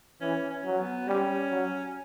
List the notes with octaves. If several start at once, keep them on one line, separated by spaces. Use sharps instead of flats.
E3 C#4
C#4
F#3
B3
G3 C#4
F#3